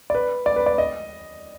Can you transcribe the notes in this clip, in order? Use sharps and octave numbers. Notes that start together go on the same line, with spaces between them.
D5
B4
D5
B4
D5
D#5